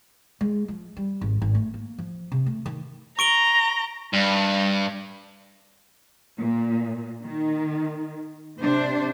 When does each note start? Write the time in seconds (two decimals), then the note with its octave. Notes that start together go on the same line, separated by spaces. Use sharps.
0.41 G#3
0.68 F3
0.97 G3
1.21 G#1
1.42 G#1
1.55 A3
1.74 A#3
1.99 F3
2.32 C3
2.46 A3
2.66 D#3
3.19 A#5 C#6 D7 G7
4.13 G2
6.39 A#2
7.22 D#3
8.60 C3 D4 C5